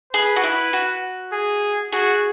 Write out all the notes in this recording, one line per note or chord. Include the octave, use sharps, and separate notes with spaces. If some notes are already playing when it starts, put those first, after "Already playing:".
G#4 B4
F#4
E4
F#4
G#4
F#4 G#4